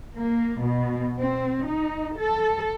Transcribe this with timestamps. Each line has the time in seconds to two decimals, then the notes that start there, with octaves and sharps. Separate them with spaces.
0.16 A#3
0.62 B2
1.19 C4
1.69 D#4
2.20 A4